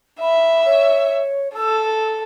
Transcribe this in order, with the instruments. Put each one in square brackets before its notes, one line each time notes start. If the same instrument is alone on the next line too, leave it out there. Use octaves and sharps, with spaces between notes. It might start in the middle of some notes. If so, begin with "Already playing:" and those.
[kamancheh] E5 [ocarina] B5
[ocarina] C#5
[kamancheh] A4 [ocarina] E6